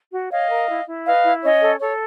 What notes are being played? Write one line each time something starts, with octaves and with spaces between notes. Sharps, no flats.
F#4
C#5 D#5 F5
A#4
E4
E4
B4 D#5 F5
E4
C#4 C#5 D#5
A4
A4 C#5